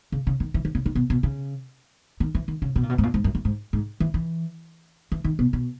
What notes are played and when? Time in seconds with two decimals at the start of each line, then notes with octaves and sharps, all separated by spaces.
0.12 C#3
0.27 C#3
0.40 D#3
0.54 E3
0.65 D#3
0.75 C#3
0.86 D#3
0.95 B2
1.10 B2
1.23 C#3
2.20 D#3
2.35 E3
2.48 D#3
2.62 C#3
2.76 B2
2.83 A#2
2.90 B2
2.98 G#2
3.03 A#2
3.14 G#2
3.24 F#2
3.35 F#2
3.45 G#2
3.73 G#2
4.00 E3
4.14 E3
5.12 E3
5.24 D#3
5.39 B2
5.53 B2